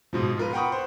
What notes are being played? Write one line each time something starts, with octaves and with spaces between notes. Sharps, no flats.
G#2 B2 F3
F4 A#4 B4
F#5 G5 A#5 B5 C#6 D#6
C5